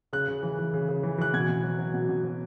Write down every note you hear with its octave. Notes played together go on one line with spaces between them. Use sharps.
C#3 F#6
C#3
E3
E3
C#3
C#3
E3
E3 F#6
B2 G#6
B2
F#3
F#3
B2
B2
F#3